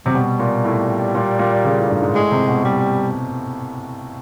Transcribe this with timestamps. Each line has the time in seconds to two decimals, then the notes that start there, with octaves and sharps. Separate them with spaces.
0.06 C3 F#3
0.15 B2 G3
0.40 A#2
0.65 A2
1.15 A#2
1.39 A#2
1.64 C#3
1.78 A2
1.90 G2
2.02 G#2
2.15 A2 G#3
2.32 C3
2.48 B2
2.64 G3